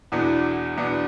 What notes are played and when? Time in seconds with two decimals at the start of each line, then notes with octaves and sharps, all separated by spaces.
0.12 E2 B2 B3 D4
0.77 E2 B2 B3 D4